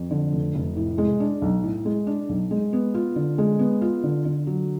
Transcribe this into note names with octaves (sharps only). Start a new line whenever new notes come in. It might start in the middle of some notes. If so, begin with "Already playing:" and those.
Already playing: F2
D3
F1
F1
A2
G#3
D4
B1
A2
G#3
D4
B1
G#3
B3
F4
D3
G#3
B3
F4
D3
D3
F#3